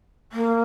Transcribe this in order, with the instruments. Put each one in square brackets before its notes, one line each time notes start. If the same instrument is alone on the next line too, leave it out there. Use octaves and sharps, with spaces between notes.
[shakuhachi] A#3